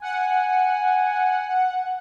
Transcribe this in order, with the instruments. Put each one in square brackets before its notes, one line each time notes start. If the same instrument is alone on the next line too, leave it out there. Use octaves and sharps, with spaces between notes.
[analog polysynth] F#5 [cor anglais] G#5